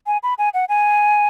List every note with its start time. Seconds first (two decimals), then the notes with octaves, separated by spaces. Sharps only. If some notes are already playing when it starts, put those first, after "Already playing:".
0.07 G#5
0.23 B5
0.38 G#5
0.54 F#5
0.69 G#5